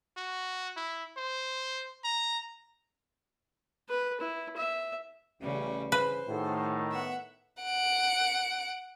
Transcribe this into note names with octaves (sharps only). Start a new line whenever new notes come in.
F#4
E4
C5
A#5
B4
E4
E5
A1 C#3 G3
G2 C#3 E3 B4 C5
A2 D#3 F#4 G#4 A4
B3 E5 F#5
F#5 D7